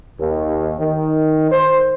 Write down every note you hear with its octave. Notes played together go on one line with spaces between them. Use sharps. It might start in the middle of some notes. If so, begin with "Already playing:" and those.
D#2
D#3
C5